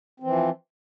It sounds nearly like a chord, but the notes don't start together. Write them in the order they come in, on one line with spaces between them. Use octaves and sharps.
C4 E3 F3